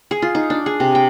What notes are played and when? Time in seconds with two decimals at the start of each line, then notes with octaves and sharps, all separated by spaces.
0.11 G#4
0.22 F4
0.35 D#4
0.50 D4
0.66 G#4
0.80 C3
0.95 G5